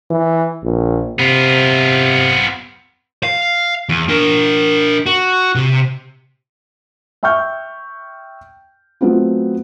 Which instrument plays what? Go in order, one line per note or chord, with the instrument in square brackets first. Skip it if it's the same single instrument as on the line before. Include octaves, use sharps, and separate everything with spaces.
[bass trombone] E3
A#1
[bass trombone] C3 [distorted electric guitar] B3 F4
[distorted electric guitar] F5
E2
D4 A#4
F#4
C3
[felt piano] E5 G5 C#6 F6 G6
F#3 A3 B3 C4 F4